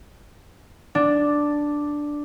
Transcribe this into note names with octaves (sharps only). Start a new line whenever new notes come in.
D4